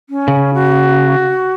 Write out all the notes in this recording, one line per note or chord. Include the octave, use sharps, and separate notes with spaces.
C#4
C#3
F#4